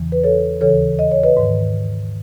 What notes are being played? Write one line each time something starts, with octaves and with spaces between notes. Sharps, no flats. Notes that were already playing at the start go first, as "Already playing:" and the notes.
Already playing: E2 C#3 E3
B4
A4 C#5
D#2 C#3 E3 A4 C#5
D#5
C#5
B4 D#5
G#2 D#3